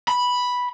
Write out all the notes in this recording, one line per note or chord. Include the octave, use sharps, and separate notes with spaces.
B5